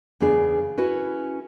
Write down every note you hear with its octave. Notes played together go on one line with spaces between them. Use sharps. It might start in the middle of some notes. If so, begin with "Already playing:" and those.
E2 C#3 B3 D4 G#4
C#4 E4 F#4 B4